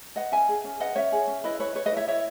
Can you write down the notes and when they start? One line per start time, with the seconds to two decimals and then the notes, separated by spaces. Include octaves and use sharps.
0.16 B4 D#5 F#5
0.32 C#4 E5 G#5
0.48 G#4
0.64 C#4
0.80 B4 D#5 F#5
0.96 C#4 C#5 E5
1.12 G#4
1.28 C#4
1.44 E4 B4 D#5
1.60 B4 C#5
1.75 B4 C#5
1.86 B4 D#5
1.92 E4 C#5 E5
2.08 E4 C#5 E5